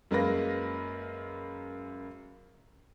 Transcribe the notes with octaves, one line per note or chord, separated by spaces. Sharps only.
F#2 G#3 A#3 B4 A#6